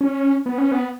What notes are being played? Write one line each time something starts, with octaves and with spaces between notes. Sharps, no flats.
C#4
B3
C#4
B3